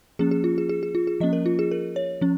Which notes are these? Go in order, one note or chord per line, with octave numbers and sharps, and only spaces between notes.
F3 A#3 C#4 G#4
G#4
F4
G#4
G#4
G#4
F4
G#4
F3 A#3 C#4 D#5
A#4
F4
G#4
A#4
C#5
F3 C#4